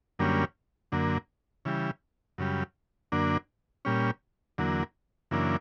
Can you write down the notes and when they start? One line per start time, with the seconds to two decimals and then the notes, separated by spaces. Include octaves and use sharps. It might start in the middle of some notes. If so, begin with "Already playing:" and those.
0.19 F#2 D3 G3 A#3 C#4
0.92 F#2 D3 A#3
1.65 C#3 E3 G3
2.38 F#2 C#3 G3
3.12 F#2 D3 A#3 D4
3.85 A#2 G3 C#4
4.58 E2 D3 F#3 A#3
5.31 F#2 C#3 E3 A#3 D4